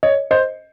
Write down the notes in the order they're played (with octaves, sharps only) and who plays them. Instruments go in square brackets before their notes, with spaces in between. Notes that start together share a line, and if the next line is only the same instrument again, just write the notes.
[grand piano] C#5 [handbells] D#5
[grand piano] C5 [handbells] D#5